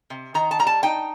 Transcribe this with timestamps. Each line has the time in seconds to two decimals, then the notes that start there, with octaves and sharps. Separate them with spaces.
0.10 C3
0.34 D#3 A#5
0.51 A5
0.59 G3 A#5
0.67 A5
0.83 D#4 G5